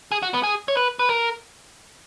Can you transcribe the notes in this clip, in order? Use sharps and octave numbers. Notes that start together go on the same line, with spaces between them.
G#4
F#4
B3
G#4
C#5
B4
B4
A#4